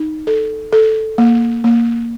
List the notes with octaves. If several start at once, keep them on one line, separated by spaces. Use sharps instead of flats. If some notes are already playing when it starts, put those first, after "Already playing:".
Already playing: D#4
A4
A4
A#3
A#3